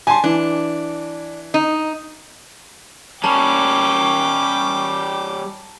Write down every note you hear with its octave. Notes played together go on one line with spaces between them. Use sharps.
G3 G#5 A5 C6
E3 D4
D#4
G3 C#4 G5 A5 A#5 C#6 D6